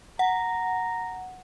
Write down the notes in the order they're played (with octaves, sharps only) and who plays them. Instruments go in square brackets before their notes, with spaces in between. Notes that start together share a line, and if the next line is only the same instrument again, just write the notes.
[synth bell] F#5 [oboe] A#5